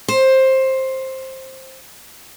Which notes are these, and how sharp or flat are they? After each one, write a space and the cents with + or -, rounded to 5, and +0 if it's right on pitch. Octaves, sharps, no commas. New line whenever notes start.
C5 +15